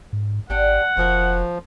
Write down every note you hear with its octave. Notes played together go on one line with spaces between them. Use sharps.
G#2
G#1 D4 G4 F#5
F1 F3 F#4 G#4 A#4